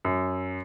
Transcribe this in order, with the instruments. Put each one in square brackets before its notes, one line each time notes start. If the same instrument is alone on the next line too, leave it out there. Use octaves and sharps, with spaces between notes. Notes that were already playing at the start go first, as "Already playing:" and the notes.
[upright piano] F#2